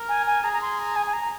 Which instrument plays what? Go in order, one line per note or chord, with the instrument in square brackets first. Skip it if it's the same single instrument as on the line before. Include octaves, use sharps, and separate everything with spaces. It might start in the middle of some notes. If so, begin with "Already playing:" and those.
Already playing: [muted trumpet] A#4
[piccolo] G#5
G#5
[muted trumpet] G#4 [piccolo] A#5
[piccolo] A#5
C6
A#5
G#5
G#5
A#5